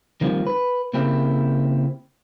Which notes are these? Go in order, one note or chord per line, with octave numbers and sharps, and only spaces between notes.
D#3 F3 G3 A#3 C4
B4
C#3 A#3 C4 E4 G4